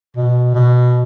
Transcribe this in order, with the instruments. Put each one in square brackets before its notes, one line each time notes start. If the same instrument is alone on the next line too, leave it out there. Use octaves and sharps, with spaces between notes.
[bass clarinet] B2
B2